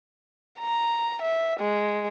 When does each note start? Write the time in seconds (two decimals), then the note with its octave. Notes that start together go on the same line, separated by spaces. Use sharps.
0.60 A#5
1.22 E5
1.60 G#3